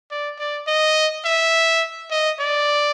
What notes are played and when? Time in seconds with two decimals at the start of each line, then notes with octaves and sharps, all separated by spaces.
0.11 D5
0.38 D5
0.67 D#5
1.25 E5
2.11 D#5
2.39 D5